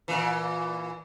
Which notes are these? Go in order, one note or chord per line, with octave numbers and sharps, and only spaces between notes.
A#2 E3